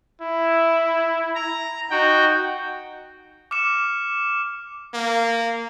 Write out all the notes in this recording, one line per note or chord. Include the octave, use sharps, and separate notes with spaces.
E4
A#5
D#4 F#4 G5
D6 F6 C#7 E7
A#3